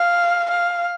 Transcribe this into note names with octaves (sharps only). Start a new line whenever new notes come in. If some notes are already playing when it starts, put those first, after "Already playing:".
Already playing: F5
F5